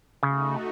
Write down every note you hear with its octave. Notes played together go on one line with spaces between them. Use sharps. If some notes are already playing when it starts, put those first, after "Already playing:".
C#3 A3 D#4 F#4